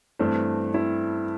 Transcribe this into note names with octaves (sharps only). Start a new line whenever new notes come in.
G2 E3 A3 C4
C4 E4